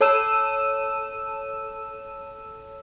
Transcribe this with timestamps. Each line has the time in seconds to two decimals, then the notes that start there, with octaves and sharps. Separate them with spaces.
0.01 A4 C#5 A5 E6 D#7 E7